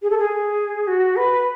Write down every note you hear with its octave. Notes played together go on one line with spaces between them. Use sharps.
G#4
A4
G#4
F#4
B4